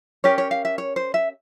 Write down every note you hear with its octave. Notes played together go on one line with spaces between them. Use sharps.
C#4 G4 A#4 C#5
C#5
F5
E5
C#5
C5
E5